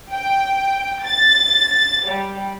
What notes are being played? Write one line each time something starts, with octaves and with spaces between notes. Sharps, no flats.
G5
A6
G3